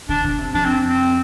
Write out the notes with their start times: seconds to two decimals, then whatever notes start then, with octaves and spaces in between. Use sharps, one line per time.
0.09 D3 D4
0.24 D3
0.38 C3
0.53 F2 D4
0.65 C4
0.89 C4